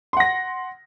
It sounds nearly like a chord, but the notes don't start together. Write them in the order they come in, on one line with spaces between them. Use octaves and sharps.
C6 F#5 A#6